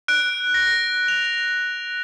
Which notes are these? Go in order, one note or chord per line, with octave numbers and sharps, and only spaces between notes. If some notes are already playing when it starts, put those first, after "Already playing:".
F#6 D7
A#6
F7